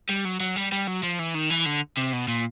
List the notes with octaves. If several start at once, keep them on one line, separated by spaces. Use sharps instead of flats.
G3
F#3
F#3
G3
G3
F#3
F3
E3
D#3
E3
D3
C3
B2
A#2